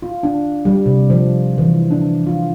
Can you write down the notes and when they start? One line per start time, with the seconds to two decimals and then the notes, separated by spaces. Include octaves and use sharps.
0.02 F4
0.23 D4
0.65 G3
0.86 C3
1.10 F3
1.58 E3
1.91 D4
2.26 F4